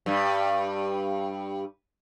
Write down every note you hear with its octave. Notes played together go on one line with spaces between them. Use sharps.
G2 G3